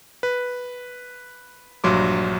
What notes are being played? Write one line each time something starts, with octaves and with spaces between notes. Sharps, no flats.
B4
A#1 G2 F#3 C6 D6